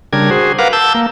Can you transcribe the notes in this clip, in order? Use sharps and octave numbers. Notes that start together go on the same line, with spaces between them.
C#3 G3 D4 A#4 G#6
F#4 G#4 C5
A#4 B4 F5 F#5 D6
A5 E6 G6
A#3